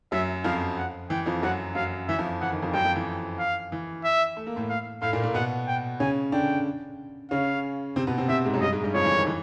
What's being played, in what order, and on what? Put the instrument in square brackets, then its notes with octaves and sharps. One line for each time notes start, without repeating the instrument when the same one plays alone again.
[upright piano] F#2 F#3 [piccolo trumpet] E5
[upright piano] F2 F3 [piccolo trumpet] F5
[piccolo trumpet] F#5
[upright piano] E3 [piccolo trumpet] G5
[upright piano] F2 F3
[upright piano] F#2 F#3 [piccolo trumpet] F#5
[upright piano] F#2 F#3 [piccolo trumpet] F5
[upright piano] E3 [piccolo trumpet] E5
[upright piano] F2 F3
[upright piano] E3 [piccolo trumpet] F#5
[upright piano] D#3
F2 F3
[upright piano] F#2 F#3 [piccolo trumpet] G5
[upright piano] F2 F3
E3
[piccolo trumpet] F5
[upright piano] E3
[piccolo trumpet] E5
[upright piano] A3
A#3
A2 A3
[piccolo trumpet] F5
[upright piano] A2 A3 [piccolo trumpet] F5
[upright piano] A#2 A#3
A#2 A#3
[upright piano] B2 B3 [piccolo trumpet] F#5
[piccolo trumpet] G5
[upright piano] C#3 C#4 [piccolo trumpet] G#5
[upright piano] D3 D4 [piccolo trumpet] G5
[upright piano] C#3 C#4 [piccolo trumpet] F5
[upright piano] C3 C4
B2 B3
C3 C4
[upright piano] C3 C4 [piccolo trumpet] E5
[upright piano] G#2 G#3
F#2 F#3
[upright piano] G2 G3 [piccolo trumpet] D#5
[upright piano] G#2 G#3
G2 G3
[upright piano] F2 F3 [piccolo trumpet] C#5
[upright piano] E3
D#3
E3